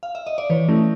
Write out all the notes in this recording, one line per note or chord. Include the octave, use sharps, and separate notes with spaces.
F5
E5
D#5
D5
E3 B4 C#5
A3 C#4 E4